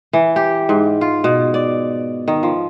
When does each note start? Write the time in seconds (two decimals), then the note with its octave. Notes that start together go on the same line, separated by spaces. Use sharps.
0.13 E3
0.36 G4
0.69 G#2
1.01 F4
1.24 B2
1.54 D5
2.28 D#3
2.43 F3